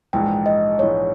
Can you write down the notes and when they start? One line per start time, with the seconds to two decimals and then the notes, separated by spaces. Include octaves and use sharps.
0.13 A#1 G#2 E3 G#3 G5
0.46 D#5
0.79 A#1 G#2 E3 G#3 C#5